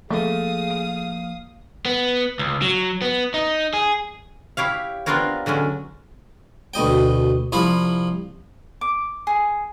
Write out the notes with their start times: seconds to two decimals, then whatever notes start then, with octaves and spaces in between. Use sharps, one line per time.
0.10 F3 A3 A#3 G#4 F5 D#6
1.85 B3
2.39 C#2
2.62 F#3
3.02 B3
3.34 D#4
3.74 G#4
4.57 E4 G4 C#5 F5
5.06 B3 C4 D4 F4 A#4 C#5
5.46 D3 F#3 G#3 C#4
6.74 D2 B2 D#5 G5
7.52 C2 F3 E4 F5
8.81 D6
9.27 G#4